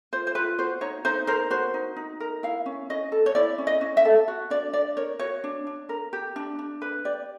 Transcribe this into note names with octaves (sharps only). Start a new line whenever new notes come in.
F4 C5
C5
F4 B4
F#4 C5
D#4 C#5
D#4 C5
A#4 C5
F#4 C5
D#4
D#4
A#4
E4 F5
C#4
C#4 D#5
A4
C#5
E4 D5
C#4
D#5
C#4
E5
A4
F#4
D4 D5
D4 D5
A#4 C#5
F#4 C#5
D4
D4
A#4
G4
D4
D4
B4
G4 D5